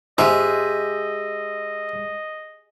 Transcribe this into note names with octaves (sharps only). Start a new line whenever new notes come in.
G#2 G#3 G4 D#5 E5